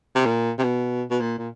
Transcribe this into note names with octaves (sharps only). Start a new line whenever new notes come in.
C3
A#2
C3
B2
B2
A#2
A#2